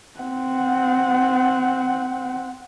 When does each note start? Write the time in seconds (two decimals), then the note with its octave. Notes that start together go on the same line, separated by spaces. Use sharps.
0.20 C4 F#5